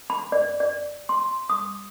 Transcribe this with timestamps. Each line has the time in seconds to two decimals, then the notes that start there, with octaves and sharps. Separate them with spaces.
0.10 B5
0.32 D5
0.60 D5
1.09 C6
1.50 D#6